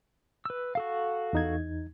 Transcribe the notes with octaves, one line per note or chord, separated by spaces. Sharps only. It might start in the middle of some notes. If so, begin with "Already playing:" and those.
B4 E6
F#4 A4 F5
E2 D#4 G#6